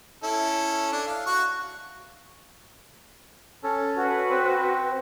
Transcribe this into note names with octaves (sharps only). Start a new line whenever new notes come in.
C#4 E4 A4
D4
F5
F#4 F#5 C#6
C#4 A4
F#4 B4
C4